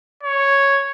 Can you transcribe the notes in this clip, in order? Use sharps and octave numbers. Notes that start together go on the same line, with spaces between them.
C#5